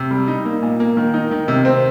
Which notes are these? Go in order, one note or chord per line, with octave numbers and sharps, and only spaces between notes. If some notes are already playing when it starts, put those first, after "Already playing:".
Already playing: C3
G3
D#4
A#3
A#2
A#3
D#3
D#4
D#3
C3
C4